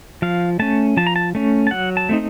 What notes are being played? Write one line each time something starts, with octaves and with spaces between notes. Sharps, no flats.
F3 F5
A3 C#4 A5
F3 A5
A#5
A5
A3 C#4
A5
F#3 F#5
A5
A3 C4 D#4